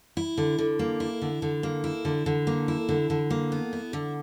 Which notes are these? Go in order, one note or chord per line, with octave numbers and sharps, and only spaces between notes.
E4
D3
D3
A#3
E4
D3
D3
A#3
E4
D3
D3
A#3
E4
D3
D3
A#3
B3
E4
D3